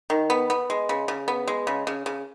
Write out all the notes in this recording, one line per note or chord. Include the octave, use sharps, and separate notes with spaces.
D#3
B3
B3
G#3
C#3
C#3
B3
G#3
C#3
C#3
C#3